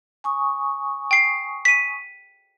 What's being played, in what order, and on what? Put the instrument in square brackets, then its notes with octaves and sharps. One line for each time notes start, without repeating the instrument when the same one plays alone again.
[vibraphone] G#5 C#6 D#6
[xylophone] G5 C7
B6 D#7